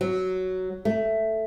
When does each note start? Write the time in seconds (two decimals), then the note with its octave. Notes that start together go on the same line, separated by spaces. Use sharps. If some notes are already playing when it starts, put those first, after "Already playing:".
0.01 F#3
0.85 A3